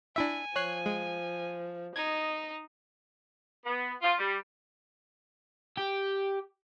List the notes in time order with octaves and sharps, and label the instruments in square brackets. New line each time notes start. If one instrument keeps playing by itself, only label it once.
[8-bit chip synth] D4 E4 E5 [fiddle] G#5
[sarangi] F3 [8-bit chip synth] C#5 F#6 C7
[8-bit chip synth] G#3
[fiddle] D#4 [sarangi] D#5 [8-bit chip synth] G#6
[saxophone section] B3
F4
G3
[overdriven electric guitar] G4